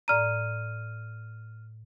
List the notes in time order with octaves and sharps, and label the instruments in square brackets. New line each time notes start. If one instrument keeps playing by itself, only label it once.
[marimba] A2 D5 A#5 [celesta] F6 D#7